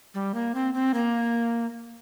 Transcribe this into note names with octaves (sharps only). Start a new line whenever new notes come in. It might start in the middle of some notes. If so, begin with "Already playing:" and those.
G3
A#3
C4
C4
A#3